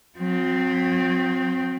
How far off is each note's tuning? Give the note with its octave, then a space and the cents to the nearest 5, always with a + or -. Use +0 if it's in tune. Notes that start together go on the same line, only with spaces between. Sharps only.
F#3 -45 C4 +0